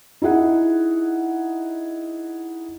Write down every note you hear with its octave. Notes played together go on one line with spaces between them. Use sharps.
D#4 E4 G#4 F#5